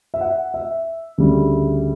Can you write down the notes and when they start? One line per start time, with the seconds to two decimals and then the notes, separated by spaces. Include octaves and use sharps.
0.14 E5
0.21 F#5
0.54 E5
1.18 D2 C#3 G3